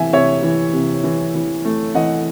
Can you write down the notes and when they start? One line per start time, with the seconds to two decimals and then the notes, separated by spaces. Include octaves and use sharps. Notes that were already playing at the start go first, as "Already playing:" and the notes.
Already playing: C3 E3 E5 G#5
0.12 C3 C#5 E5
0.43 E3
0.73 C3
1.04 E3
1.35 E3
1.65 A3
1.95 E3 D#5 F#5